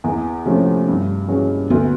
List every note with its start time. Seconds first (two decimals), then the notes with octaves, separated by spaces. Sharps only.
0.04 E2
0.45 C3 F3 A3 C#4
0.88 G2
1.28 E3 G#3 C#4 F#4
1.70 D2 B3